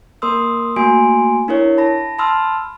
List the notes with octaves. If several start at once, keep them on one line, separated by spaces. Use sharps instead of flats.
A#3 A#4 C6 D#6 E6
A3 A#3 F#4 G#5 C6 D7
D4 E4 A#4 C#5
A5 B5 A#6
A5 B5 C6 E6 F6